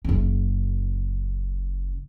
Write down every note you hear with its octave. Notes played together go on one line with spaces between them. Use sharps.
F#1 C#3